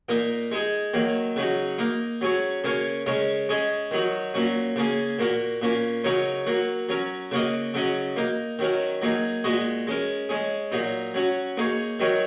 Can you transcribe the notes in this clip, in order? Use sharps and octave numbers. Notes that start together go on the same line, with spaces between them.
A#2 A#3 D#4 A#4
G#3 D#4 G#4
D#3 F#3 A#3
C#3 F#3 D#4 F#4
A#3 D#4 A#4
F#3 C#4 G#4 C#5
C#3 A#3 C#4 A#4 C#5
C#3 G#3 C#4 A#4 C#5
G#3 C#4 G#4 D#5
D#3 F#3 D#4 F#4
A#2 F#3 C#4 F#4
C#3 A#3 C#4 G#4
A#2 A#3 F#4 A#4
A#2 A#3 C#4
C#3 F#3 D#4 A#4 C#5
F#3 A#3 F#4
F#3 C#4 A#4
C#3 A#3 F#4 A#4 D#5
C#3 F#3 C#4 F#4 D#5
A#3 D#4 A#4
D#3 F#3 C#4 A#4
F#3 A#3 D#4 G#4
A#2 G#3 F#4 D#5
G#3 C#4 A#4
G#3 C#4 G#4
A#2 F#3 D#4
F#3 C#4 F#4
A#3 D#4 G#4 C#5
D#3 F#3 D#4 A#4 C#5